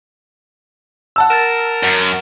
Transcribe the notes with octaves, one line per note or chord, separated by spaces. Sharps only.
F#5 A5 E6
A#4 A6 E7
F#2